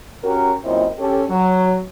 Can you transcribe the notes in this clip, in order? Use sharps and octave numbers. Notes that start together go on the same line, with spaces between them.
C#4 F#4 G4 A#4
F#2 A#2 C4 E4 C5 D#5
C#4 G4 A4
F#3